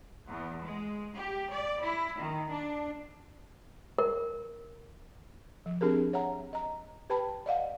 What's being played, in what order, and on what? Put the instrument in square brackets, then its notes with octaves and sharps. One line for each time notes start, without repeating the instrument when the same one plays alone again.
[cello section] E2
G#3
G4
D5
E4
D#3
D4
[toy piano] A#4
[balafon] F3
C4 D4 G4 G#4 A#4
C#5 E5 F#5 A#5
D#5 A#5
G4 B4 G5 A5 B5
D5 D#5 F5 F#5